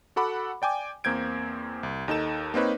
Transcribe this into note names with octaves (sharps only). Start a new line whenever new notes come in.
F#4 A4 F#5 B5 D6
D5 G5 G#5 D6
E2 A#3 C4 G6 G#6 D7
C2
D#2 D#4 A4 E7
A#3 C4 D#4 B4 C#5